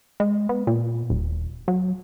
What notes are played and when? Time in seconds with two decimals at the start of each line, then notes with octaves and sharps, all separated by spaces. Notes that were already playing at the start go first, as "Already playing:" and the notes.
0.20 G#3
0.49 B3
0.67 A#2
1.10 D#1
1.68 F#3